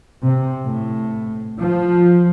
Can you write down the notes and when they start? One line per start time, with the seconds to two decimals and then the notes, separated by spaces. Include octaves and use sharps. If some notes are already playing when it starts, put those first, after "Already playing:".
0.23 C3
0.64 A2
1.61 F3